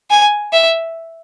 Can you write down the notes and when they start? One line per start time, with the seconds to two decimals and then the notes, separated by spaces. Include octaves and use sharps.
0.10 G#5
0.53 E5